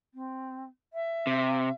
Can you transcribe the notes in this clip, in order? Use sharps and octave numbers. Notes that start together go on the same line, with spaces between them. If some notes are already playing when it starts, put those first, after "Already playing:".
C4
E5
C3